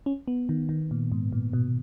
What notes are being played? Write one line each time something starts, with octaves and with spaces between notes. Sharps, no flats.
C#4
B3
D#3
D#3
A#2
G#2
A#2
B2